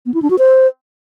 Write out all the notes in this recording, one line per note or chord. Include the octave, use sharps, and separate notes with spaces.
B3
E4
D4
F#4
C5